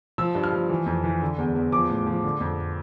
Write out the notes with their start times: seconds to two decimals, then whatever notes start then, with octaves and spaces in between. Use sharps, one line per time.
0.18 F3 E6
0.35 G2
0.44 F6
0.53 F3
0.69 E3
0.86 F2
1.04 E3
1.22 D3
1.38 E2
1.55 E2
1.72 F3 D6
1.89 A2
2.07 F3
2.24 D3
2.40 F2